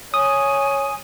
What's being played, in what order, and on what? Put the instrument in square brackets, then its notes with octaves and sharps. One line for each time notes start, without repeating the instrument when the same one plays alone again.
[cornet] C#5 [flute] G#5 [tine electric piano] D#6